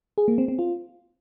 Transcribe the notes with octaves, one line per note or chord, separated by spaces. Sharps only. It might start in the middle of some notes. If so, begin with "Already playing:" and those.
G#4
A#3
C4
C4
F4